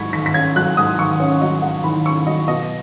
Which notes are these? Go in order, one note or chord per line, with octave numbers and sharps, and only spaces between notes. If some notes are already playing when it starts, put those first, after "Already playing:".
Already playing: G#2 D#3 F#3 B5 C#6 G#6 B6
D#3 B6
B6
C#4 G#6
F#3 F#6
G#2 D#6
D#3 C#6
C#4
F#3 D#5
G#2 F#5
D#3 B5
C#4 C#6
F#3 D#5
B2 D#5